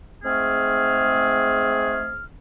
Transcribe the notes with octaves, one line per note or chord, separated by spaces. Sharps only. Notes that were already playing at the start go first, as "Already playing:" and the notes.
G#2 A3 C4 G#4 F6